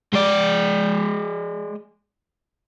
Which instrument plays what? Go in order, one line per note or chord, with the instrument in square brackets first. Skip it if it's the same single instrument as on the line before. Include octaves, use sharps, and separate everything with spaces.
[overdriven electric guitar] G#3 D5